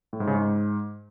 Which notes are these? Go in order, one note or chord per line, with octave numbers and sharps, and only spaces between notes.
A2
G#2
C#3
G#2